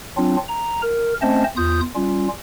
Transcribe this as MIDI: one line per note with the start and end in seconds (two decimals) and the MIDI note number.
0.17 0.37 54
0.17 0.37 60
0.17 0.37 62
0.17 0.37 65
0.48 0.82 82
0.82 1.14 70
1.22 1.44 57
1.22 1.44 60
1.22 1.44 61
1.22 1.44 72
1.22 1.44 75
1.22 1.44 81
1.57 1.81 40
1.57 1.81 65
1.57 1.81 87
1.57 1.81 91
1.95 2.28 55
1.95 2.28 61
1.95 2.28 65